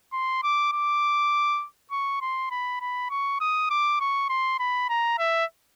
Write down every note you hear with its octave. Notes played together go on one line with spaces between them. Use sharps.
C6
D6
D6
C#6
C6
B5
B5
C#6
D#6
D6
C#6
C6
B5
A#5
E5